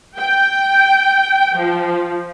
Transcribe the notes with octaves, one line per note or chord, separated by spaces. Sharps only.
G5
F3